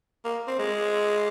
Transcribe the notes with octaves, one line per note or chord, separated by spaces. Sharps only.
A#3
C4
G#3